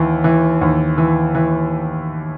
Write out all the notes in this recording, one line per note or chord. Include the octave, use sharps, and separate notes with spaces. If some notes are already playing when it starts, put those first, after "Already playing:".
Already playing: D#2 E3
E3
D#2
E3
E3